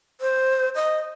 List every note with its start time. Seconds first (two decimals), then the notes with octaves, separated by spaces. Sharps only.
0.21 C5
0.75 D#5